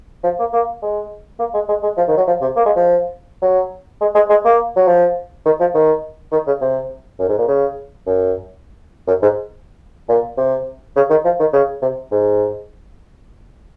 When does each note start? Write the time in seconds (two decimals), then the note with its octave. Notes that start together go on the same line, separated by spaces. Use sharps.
0.24 F3
0.39 A#3
0.53 A#3
0.82 G#3
1.40 A#3
1.54 G#3
1.69 G#3
1.83 G#3
1.98 F3
2.08 D#3
2.18 F#3
2.28 F3
2.42 C3
2.56 A#3
2.66 G#3
2.76 F3
3.42 F#3
4.01 G#3
4.15 G#3
4.30 G#3
4.45 A#3
4.76 F#3
4.88 F3
5.46 D#3
5.60 F3
5.75 D#3
6.32 D#3
6.47 C#3
6.61 C3
7.19 F#2
7.29 G#2
7.38 A#2
7.48 C#3
8.07 F#2
9.08 F#2
9.22 G#2
10.09 A#2
10.38 C3
10.96 C#3
11.10 D#3
11.25 F3
11.40 D#3
11.53 C#3
11.82 C3
12.12 G#2